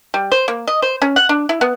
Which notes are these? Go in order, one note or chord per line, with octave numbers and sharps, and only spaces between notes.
G3
C5
A#3
D#5
C5
C#4
F#5
D4
E4
B3